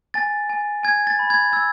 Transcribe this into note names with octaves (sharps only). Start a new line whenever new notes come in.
G#5 A6
G#5
G#5 G#6
A6
B5
G#6
E6 G#6